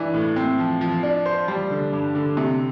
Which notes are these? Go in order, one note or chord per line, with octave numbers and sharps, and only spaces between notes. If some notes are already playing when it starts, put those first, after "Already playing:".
Already playing: G2 E3 D4
A2
C4
F3
F3
D4
C5
G3
D3
G2
D3
C3